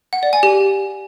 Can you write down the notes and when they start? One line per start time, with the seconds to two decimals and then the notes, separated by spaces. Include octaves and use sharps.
0.13 F#5
0.23 D5
0.33 G#5
0.43 G4